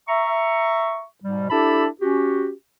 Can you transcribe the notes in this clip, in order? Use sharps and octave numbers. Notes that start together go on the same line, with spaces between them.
E5 A#5 C#6
G#2 B2 G3
D4 E4 G4 A4 A5 B5
C#4 F#4 G4